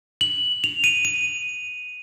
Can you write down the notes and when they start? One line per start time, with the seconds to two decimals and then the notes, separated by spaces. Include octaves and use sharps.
0.21 F#7
0.64 F7
0.84 D#7
1.05 D#7